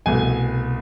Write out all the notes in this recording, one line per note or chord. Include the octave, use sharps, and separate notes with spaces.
C2 B2 A3 G#5